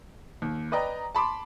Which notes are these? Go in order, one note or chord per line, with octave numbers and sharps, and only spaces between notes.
D#2
B4 D5 D#5 G5 A#5
A5 B5 C6 D6